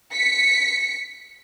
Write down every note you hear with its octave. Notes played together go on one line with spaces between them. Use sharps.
B6 C#7